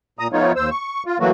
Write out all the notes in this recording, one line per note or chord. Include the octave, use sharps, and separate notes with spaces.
A#2 A#5 D#6
F3 A3 B3 D#4 F4 C#5
D#2 C5 E6
C#6
F4
E3 F#3 A3 A#3 F#4